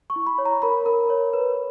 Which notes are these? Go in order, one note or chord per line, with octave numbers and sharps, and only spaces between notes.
C#6
E4
B5
C#5
A#5
A#4 B5
A#4
C#5
B4